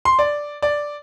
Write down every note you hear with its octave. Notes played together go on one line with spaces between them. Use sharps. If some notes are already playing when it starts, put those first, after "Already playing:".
C6
D5
D5